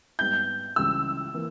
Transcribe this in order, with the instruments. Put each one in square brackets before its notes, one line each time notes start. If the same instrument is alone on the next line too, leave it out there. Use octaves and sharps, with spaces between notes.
[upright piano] G#2 G3 B3 D#4 [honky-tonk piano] G6
[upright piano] C#2 C#3 E3 G3 [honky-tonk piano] E6
[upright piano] E3 A#3